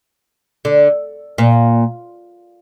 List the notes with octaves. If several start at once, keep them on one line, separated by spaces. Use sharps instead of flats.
D3
A#2